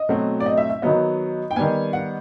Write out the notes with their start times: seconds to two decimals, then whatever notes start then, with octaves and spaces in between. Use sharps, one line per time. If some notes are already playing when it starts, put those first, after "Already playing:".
Already playing: D#5
0.09 B2 F#3 A3 C4
0.40 D5
0.46 D#5
0.57 E5
0.70 E5
0.82 D#3 F#3 B3 D#5
1.51 G5
1.56 D#3 G3 B3 G#5
1.93 F#5